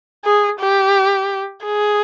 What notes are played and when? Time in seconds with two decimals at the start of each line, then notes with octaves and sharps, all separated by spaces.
0.24 G#4
0.59 G4
1.66 G#4